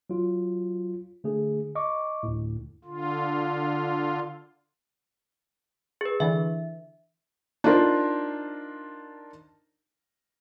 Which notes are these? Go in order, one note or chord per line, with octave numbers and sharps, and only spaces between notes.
F#3 F4
D3 A3 G#4
D#5 C#6 D6
D2 A2
D3 F4
G#4 B4
D3 E3 E5
D4 D#4 F4 A#4 C5